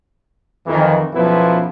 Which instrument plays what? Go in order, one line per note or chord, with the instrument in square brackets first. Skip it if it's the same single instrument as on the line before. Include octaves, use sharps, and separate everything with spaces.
[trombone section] F2 D#3 E3
B1 F#2 F3 B3 E4 B4